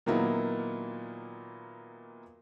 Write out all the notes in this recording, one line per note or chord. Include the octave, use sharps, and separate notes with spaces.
A#2 D#3 F#3 A#3 B3 E4